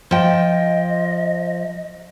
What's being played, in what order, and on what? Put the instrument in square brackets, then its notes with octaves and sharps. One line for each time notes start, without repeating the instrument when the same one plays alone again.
[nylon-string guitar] F3 G5 [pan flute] D#5